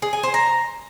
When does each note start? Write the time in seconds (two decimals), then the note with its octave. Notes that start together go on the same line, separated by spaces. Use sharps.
0.02 G#4
0.13 G#5
0.23 C5
0.34 A#5